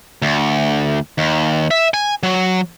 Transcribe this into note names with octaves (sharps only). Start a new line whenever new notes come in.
D2
D#2
E5
G#5
F#3